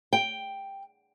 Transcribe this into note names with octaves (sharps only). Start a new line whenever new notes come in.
G5